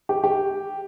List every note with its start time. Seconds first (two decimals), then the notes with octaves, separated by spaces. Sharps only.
0.09 G4
0.24 G4